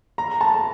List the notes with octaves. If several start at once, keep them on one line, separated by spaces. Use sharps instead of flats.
A#5
A5